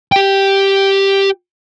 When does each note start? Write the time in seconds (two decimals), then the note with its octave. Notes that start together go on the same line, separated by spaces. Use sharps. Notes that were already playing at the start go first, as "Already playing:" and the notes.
0.12 G4 G5